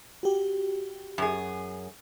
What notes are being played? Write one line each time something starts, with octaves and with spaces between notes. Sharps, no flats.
F#4 G4
F#2 G#4